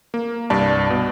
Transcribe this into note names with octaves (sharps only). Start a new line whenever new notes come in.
A#3
C2 G2 D5 A5
B2